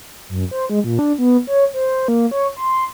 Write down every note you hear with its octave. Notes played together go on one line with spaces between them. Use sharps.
F#2
C5
G#3
A#2
D4
B3
C#5
C5
A#3
C#5
C6